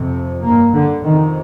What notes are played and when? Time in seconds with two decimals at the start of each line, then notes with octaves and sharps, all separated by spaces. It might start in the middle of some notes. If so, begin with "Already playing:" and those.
Already playing: F2 C3
0.43 G2 A#3
0.74 D3
1.03 F2 C3 D#3